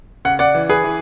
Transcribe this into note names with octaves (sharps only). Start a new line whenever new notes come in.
C#3 F#5
D5 F#5
E3
G#4 B4
E3